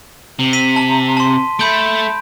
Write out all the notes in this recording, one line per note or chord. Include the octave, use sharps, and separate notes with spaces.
C3
B6 D#7
A5
A5 C6
A3 B5 G6 D7